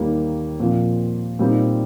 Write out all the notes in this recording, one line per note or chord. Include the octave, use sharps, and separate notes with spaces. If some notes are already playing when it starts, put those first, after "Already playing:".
Already playing: D#2 D#3 G3 A#3 D#4
A#2 F3 C4
A#2 G3 C4 D#4